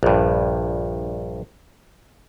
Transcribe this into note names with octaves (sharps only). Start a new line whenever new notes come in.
A#1 G2